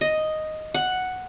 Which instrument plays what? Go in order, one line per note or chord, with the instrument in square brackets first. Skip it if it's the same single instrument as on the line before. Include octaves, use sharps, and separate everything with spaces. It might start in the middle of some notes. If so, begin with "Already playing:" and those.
[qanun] D#5
F#5